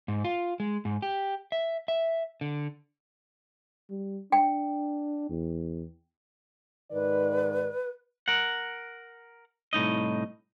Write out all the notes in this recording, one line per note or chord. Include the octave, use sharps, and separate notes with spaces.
G#2
F4
G#3
G#2
G4
E5
E5
D3
G3
D4 G5
E2
G#2 D#3 B4 D5
A#4 F#5
C2 A2 D#4 D#5